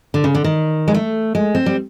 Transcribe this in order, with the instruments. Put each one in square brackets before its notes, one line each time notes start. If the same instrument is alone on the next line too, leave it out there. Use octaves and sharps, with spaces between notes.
[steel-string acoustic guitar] D3
C#3
D3
D#3
G#3
A3
G#3
C4
G3